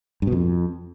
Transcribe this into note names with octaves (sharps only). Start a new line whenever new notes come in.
G2
B2
F2